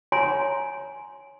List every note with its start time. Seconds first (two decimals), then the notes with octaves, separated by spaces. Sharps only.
0.12 C#5 G#5 A#5 C6